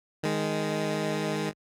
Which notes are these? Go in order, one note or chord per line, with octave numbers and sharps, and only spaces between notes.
D#3 G#3